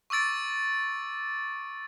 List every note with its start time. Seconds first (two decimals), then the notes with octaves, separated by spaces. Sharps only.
0.10 C#6 D6 E6 A6 D7